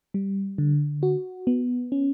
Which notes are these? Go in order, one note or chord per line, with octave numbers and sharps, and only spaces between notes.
G3
D3
F#4
B3
C#4